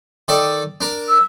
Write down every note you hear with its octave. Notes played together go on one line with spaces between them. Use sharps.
D#3 A4 D5
D4 A#4
E6